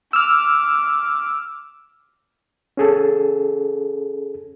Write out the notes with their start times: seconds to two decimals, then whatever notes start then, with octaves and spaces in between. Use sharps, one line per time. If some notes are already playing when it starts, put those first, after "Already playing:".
0.13 D6 E6 F6
2.77 C#4 G#4 A4